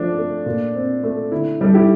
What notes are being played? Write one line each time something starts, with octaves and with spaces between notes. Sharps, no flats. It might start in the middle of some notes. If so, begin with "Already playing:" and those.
Already playing: F3 A3 D4
A3
A#2
C4
A3
D3 E4
G3 A4
E4 G4